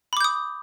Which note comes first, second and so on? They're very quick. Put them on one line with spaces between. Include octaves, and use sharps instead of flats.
B5 D6 G6 D#6